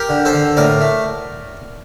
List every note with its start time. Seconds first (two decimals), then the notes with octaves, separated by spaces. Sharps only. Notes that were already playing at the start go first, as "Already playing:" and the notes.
Already playing: G4 A#4
0.09 D3
0.25 A4 C5
0.33 D3
0.57 A2 A#4 D5
0.81 A3